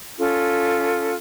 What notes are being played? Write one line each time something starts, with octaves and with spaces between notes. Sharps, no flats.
C#4 F4 A4